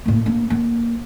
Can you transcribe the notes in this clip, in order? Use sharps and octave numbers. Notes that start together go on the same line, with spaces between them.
A2 A#3
A#3 D4
A#3